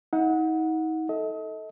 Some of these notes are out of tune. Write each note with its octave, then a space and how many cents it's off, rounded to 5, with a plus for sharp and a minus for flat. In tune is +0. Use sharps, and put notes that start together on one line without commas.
D#4 +40 F#5 -20
A4 +0 D#5 +40